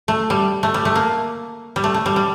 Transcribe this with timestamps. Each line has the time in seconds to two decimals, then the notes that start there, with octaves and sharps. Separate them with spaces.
0.08 A3
0.30 G3
0.63 A3
0.74 G3
0.85 A3
0.95 A#3
1.76 G3
1.84 A3
1.94 A3
2.06 G3
2.16 G3